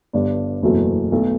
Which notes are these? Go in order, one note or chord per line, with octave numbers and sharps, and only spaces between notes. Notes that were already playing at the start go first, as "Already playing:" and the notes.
G1 G2 D3 G3 D4
F#1 E2 B2 F#3 A3
B1 B2 A3